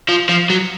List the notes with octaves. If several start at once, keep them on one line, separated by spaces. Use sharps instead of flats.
F3
F3
F#3